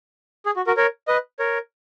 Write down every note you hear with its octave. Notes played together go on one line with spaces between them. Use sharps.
G#4
F#4
F#4 A#4
A#4 C#5
B4 D#5
A#4 C#5